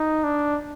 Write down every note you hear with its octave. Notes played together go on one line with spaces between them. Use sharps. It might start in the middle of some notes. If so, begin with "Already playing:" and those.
Already playing: D#4
D4